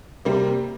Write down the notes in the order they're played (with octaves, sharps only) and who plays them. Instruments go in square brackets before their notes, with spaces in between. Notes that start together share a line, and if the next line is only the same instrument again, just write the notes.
[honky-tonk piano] C3 G3 A#3